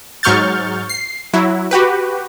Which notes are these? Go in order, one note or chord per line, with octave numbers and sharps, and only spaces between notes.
G#2 F#3 C#6 F6 G6 A6
C7
F#3 E4
F#4 G4 B4